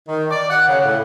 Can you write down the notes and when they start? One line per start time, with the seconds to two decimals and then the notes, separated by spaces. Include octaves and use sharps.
0.08 D#3
0.31 D5
0.50 F#5
0.68 C#3
0.85 A2